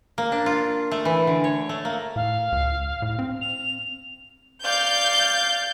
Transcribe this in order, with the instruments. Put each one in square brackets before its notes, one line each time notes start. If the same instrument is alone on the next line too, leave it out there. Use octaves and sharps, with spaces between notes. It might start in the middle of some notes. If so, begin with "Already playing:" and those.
[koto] A#3
D4
F4
A3
E3
D3
C#5
A3
A#3
[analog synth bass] A2 [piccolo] F5
[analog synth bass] C#2
A2
C4
[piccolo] F7
[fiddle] D5 F5 [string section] G6